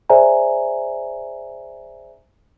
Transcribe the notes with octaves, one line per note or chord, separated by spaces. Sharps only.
G#4 C5 D5 E5 G#5 A#5